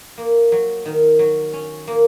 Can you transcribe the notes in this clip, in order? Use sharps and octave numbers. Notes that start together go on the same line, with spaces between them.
A#3
F#3
D#3
F#3
C#4
A#3